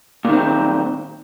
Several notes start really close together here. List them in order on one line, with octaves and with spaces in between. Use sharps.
A#2 D#3 C4